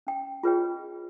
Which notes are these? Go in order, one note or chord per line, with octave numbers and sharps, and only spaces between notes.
C#4 G5
F4 G#4 B4 C#5 D#5 G5